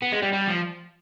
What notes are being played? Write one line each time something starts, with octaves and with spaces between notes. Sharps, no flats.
B3
G#3
G3
G3
F3